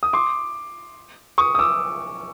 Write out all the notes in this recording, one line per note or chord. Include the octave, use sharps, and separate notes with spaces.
D#6
C6 D6
C#6 D#6
D#6
D6 E6